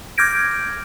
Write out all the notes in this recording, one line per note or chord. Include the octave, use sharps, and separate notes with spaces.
D6 F6 G6 G#6 A#6 D7